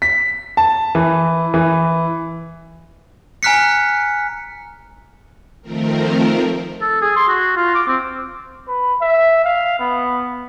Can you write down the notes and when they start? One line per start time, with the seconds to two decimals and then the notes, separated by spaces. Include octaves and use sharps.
0.02 B6
0.57 A5
0.95 E3
1.54 E3
3.43 G#5 A#5 F6 F#6 B6 C#7
5.62 D#3 F3 A3 C4 A#4
6.81 A4
7.02 G#4
7.16 C6
7.28 F#4
7.56 F4
7.75 D6
7.87 C4
8.68 B4
9.01 E5
9.44 F5
9.79 B3